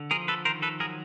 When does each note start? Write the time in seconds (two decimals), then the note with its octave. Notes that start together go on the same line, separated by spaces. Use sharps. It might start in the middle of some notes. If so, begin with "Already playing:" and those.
Already playing: D3
0.11 F3 G#4 A#4
0.28 A4 B4
0.45 D#3 A#4 C5
0.62 A4 B4
0.80 F#3 G#4 A#4